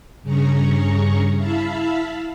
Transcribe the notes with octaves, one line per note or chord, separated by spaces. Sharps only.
G2 C#3 C#4 G#4 A#5 C#6
E4 E5 F5 A5 B5